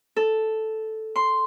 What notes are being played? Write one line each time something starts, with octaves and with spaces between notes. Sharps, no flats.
A4
C6